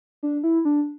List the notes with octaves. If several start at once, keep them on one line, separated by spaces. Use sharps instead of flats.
D4
E4
D4